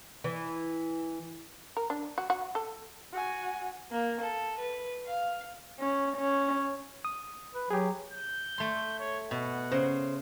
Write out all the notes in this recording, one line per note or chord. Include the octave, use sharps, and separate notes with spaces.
E3
A#4
D4
F#4
F#4
A4
F#4 G#5
A#3
A4
B4
F5
C#4
C#4
D#6
B4
F#3 G4 G#4
G6
A3 C6
C#5
B2 F#5
C#3 C5